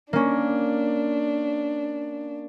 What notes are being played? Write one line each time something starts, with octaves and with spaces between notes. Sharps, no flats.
A#3 C#4 D4